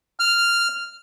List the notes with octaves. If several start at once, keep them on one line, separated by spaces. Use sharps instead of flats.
F6